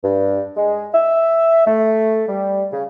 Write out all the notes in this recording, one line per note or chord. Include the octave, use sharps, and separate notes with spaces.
G2
G#3
E5
A3
G3
C#3